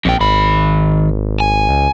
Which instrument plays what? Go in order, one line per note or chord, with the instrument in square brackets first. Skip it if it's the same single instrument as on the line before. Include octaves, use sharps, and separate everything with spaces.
[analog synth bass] A#1 [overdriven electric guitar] F2 G5
[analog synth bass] G#1 [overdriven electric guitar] D#3 B5
[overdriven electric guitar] G#5
[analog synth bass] C#2